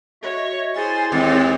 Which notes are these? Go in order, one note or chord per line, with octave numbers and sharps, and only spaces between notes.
F#4 C#5 D#5 E5
E4 G#4 C5 G#5 A6
D#2 G#3 C4